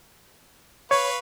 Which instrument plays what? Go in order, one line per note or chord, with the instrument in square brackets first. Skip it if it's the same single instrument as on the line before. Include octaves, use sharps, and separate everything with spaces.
[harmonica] B4 F5 C#6 [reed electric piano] C#5